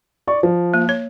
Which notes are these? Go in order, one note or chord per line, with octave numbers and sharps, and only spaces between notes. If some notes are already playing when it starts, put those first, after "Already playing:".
D5 C#6
F3
A#3
C#5